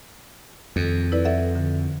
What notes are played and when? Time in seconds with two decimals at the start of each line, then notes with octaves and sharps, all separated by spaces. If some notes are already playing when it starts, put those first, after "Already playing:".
0.76 F2 D#3
1.12 E4 B4 D5
1.25 A4 E5 F#5
1.55 D3